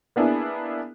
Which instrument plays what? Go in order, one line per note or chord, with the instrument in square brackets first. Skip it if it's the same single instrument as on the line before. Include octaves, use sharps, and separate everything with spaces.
[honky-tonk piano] A#3 B3 D4 E4 G#4